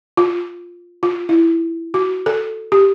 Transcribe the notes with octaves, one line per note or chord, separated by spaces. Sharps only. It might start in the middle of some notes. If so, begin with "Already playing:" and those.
F4
F4
E4
F#4
A4
G4